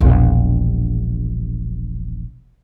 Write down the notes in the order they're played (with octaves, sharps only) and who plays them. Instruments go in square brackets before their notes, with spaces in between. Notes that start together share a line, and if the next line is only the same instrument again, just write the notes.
[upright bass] E1 A#1